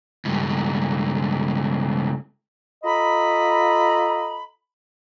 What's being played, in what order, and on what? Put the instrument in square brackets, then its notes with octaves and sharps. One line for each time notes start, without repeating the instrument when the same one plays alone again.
[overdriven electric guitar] C#2 G2
[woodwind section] F4 A4 D#5 A#5 B5